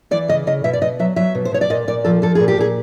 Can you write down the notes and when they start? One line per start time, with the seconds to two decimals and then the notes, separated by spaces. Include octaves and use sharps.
0.11 E3 D5
0.28 C#3 D#5
0.47 C#3 D#5
0.64 B2 E5
0.73 D5
0.81 B2 D#5
0.99 F#3 E5
1.16 F#3 E5
1.35 B2
1.45 C5
1.52 B2 C#5
1.61 D5
1.70 A#2 D#5
1.88 A#2 D5
2.04 F3 A4
2.22 F3 A4
2.35 A#2 G#4
2.48 G4
2.58 A#2 G#4